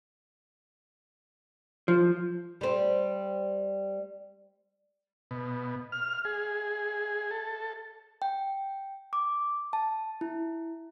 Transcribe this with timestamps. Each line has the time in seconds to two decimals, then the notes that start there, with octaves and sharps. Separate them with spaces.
1.88 F3
2.61 G3 C4
5.31 B2
5.92 F6
6.25 G#4
7.31 A4
8.22 G5
9.13 D6
9.73 A5
10.21 E4